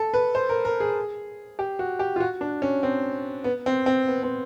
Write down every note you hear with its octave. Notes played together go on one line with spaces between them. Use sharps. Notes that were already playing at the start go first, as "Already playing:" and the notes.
Already playing: A4
B4
C5
A#4
A#4
G#4
G4
F#4
G4
F4
F#4
D4
C#4
C4
B3
C4
C4
B3
C4